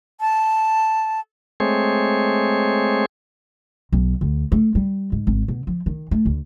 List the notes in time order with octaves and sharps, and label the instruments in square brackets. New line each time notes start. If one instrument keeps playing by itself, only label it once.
[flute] A5
[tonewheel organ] G#3 A3 C4 G#4 C5 C#5
[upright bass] B1
D2
A3
G3
G#2
G#1
B2
F3
D#3
A3
D2